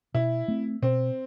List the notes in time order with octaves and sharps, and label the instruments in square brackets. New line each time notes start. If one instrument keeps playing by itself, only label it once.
[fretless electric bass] B2 [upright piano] E4
[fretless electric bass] A3 C4
[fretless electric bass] B2 [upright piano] C4